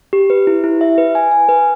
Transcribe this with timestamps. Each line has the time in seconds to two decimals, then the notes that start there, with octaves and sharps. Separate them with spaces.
0.13 G4
0.30 B4
0.47 E4
0.64 E4
0.81 E5
0.98 B4
1.15 G#5
1.31 G#5
1.49 B4